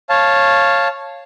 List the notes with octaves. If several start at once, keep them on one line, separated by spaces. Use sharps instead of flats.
C#5 F5 A5